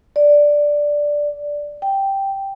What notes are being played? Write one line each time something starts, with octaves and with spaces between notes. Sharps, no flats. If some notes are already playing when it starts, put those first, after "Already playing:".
D5
G5